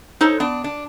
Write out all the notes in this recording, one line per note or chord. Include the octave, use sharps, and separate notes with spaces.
D#4 A4 C5 C#5
B3 D4
D4